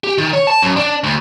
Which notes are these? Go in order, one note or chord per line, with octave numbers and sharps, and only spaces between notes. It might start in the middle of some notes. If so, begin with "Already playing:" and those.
G4
D#3
C#5
A5
F#2
D4
D2